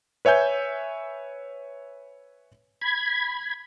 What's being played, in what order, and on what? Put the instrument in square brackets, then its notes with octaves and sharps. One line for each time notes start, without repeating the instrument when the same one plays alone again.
[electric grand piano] B4 C#5 E5 G#5 G6
[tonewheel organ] B5 G#6